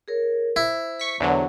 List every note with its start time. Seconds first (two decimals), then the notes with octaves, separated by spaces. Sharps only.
0.08 G#4 A#4 C#5
0.56 E4 C5
0.99 C#6 B6
1.20 E2 D3 F#3 C5 C#5 F#5